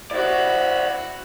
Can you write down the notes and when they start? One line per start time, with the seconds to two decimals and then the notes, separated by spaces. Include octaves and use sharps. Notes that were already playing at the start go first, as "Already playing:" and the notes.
0.11 E4 F#4 C5 D5